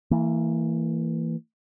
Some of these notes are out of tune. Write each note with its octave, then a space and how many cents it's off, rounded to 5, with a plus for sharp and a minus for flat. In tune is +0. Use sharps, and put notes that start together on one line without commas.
E3 +0 A#3 -30